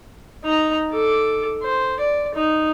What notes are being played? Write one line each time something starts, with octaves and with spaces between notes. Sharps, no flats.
D#4 A#5
A4 D6
C5
D5
D#4